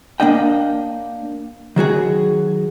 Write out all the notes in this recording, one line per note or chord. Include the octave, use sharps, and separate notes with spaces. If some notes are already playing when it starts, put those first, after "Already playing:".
A#3 D4 D#5 G5
D#3 F#3 F#4 G#4